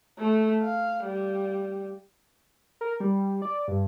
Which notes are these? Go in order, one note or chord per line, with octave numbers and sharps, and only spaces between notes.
A3
F5
G3
A#4
G3
D5
G2